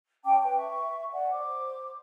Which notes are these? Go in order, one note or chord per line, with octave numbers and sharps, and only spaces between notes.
C#4 G5 A5 D6
B4 G5
E5 C#6
D5 F#5 G#5
C5 D6